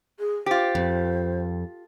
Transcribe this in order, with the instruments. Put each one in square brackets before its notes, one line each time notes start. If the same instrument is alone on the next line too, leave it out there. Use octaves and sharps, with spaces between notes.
[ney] G#4
[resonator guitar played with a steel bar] F4 G4 [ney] C5
[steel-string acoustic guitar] F2